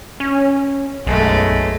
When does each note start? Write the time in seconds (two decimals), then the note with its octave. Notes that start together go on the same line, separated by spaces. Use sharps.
0.20 C#4
1.07 B1 F#2 G#3 A3